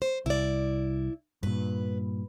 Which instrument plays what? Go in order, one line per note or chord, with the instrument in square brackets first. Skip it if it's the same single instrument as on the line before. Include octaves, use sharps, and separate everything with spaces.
[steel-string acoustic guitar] C5
[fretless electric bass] C2 [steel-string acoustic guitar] E4 D5
[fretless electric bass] G2 A#2 [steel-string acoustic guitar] B4